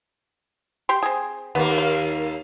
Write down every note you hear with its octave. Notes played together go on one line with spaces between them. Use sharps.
G4 G5 C6
C4 G#4
D#2 A#3 B3
F5